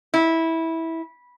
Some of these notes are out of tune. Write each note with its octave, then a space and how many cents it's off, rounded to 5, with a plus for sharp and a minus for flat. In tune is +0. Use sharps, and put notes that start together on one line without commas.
E4 -15